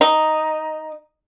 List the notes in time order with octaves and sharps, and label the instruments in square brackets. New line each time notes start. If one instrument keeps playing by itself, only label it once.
[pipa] D#4